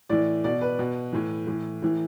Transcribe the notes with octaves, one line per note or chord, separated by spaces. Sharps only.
A2 E3 D5
B2 D5
B4
B2
A2 E3
A2 E3
A2 E3